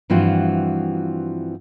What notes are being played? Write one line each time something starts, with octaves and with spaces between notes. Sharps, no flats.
G2 E3 F3 C4 F4 F#4